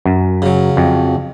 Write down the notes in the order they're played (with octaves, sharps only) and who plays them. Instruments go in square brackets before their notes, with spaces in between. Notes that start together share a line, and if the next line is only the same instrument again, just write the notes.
[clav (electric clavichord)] F#2
[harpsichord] C#3 F#3
[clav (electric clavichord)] F2